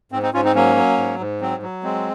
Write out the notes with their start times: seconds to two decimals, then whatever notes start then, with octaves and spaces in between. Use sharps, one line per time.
0.12 G#2 C4
0.22 C4 D#4
0.33 G#2 C#4 F4
0.45 C4 D#4
0.55 F#3 A#3 C#4
0.76 F#3
0.97 G#2
1.19 G#2
1.41 F#3 C4
1.62 F#3
1.83 G#3 C4